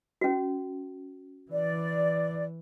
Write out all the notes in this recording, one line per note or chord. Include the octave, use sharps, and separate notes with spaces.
C#4 F#4
E3 D5